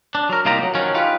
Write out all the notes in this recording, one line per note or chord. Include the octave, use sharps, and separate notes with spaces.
D4
F#3 A#4
C2 A#3 D#4 F4 G4 A#5
F#3 A#3
D#3 F3 F#3 C#4
D#4 F4 G4 B4